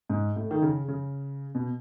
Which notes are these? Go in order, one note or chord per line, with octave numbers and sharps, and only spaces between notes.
G#2
A2
D#3
C#3
C#3
B2